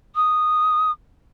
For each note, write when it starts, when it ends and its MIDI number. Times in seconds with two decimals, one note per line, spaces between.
0.15 0.91 87